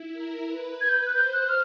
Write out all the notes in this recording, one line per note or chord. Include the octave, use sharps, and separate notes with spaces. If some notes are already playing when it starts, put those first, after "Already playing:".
Already playing: E4
A#4
B4
G#6
G6
F#6
C5 G6
F#6
F6